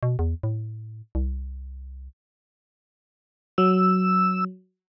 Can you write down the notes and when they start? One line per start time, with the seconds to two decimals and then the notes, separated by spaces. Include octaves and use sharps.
0.03 B2
0.19 E2
0.43 A2
1.15 C2
3.58 F#3 E6